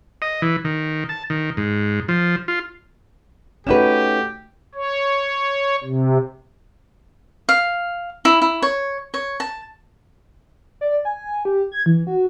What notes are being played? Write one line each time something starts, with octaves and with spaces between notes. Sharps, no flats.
D#5
E3
D#3
A5
D#3
G#2
F3
F4
A3 C#4 D#4 F#4 G4 B4 E7
C#5
C3
F5
E4
E4
C#5
C#5
A5
D5
G#5
G4
G#6
E3
F#4